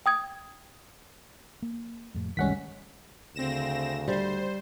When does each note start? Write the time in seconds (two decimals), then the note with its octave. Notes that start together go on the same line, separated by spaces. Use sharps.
0.06 G5 D#6 G#6
1.62 A#3
2.14 F2 A2
2.37 F#1 C2 D#3 G3 G#3 C#4 F#5 B6
3.35 D2 C#3 C4 A#6 E7
4.08 G3 C5